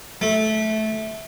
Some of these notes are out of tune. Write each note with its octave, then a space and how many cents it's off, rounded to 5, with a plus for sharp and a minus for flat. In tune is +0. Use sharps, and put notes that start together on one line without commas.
A3 -15